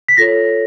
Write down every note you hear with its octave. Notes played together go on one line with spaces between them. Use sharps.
B6
F4 A4 C#5 A#6